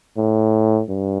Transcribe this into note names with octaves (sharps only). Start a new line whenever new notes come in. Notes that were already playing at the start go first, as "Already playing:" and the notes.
A2
G2